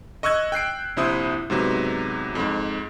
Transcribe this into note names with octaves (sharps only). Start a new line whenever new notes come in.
D#5 C#6 E6 F#6 G#6
G5 F#6 C7 D7
A#1 C3 E4 C5 D#6
G#2 C3 F#3 B3
F2 G#2